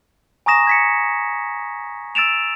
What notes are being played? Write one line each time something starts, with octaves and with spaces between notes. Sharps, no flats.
G#5 A#5 C#6 D#6 A#6 E7
G#6 B6 C#7
E6 A6 D7 E7 F7